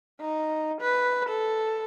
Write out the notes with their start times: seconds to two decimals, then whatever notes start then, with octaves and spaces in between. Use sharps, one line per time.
0.21 D#4
0.81 B4
1.29 A4